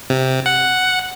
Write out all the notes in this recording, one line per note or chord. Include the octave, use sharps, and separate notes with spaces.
C3
F#5